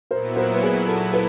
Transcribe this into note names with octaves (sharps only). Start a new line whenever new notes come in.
A#2 F#3 B3 E4 A#4 C5
A#4 C5
B4
G#4 A#4
A4
A4 B4